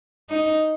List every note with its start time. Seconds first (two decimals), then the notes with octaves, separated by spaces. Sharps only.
0.29 D#4